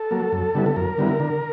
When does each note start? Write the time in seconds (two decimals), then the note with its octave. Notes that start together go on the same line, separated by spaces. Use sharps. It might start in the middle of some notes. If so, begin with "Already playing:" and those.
Already playing: A4
0.11 F#3 A#3
0.32 F#2
0.55 D3 G3 B3 E4
0.66 A4
0.76 F#2 A#4
0.98 D3 G3 B3 E4
1.20 D3